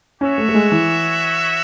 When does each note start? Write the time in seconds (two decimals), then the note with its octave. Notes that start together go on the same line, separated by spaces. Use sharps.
0.20 C#4 F#4 C#5 E5
0.38 A3
0.49 A3
0.55 G#3
0.72 E3